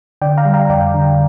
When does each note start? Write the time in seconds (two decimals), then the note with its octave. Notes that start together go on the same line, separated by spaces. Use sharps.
0.21 D3 D5 G5
0.37 F5 A#5
0.45 G3
0.54 F5 A#5
0.69 F2 D5 G5
0.94 D3